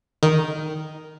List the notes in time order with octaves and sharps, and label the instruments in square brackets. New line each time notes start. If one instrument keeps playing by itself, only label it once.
[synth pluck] D#3